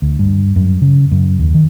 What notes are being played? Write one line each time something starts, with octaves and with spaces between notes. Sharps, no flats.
D2
G2
F#2
C#3
F#2
D#2
D#3